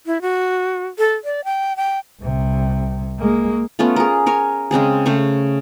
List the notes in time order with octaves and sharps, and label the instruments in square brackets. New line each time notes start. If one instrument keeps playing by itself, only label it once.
[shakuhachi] E4
F#4
A4
D5
G5
G5
[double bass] C2 C3
G#3 A#3
[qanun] A3 B3 C#4 F4
G#4 A#4
A#4 C#5 G#5
C#3 G#3 C4 G#4
C#3 A3 C5 C#6